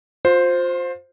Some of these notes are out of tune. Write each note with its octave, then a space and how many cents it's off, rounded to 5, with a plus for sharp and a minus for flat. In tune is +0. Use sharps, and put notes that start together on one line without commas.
F4 +30 C5 +0